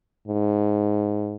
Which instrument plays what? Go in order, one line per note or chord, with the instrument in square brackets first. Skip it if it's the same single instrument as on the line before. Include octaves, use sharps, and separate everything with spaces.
[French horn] G#2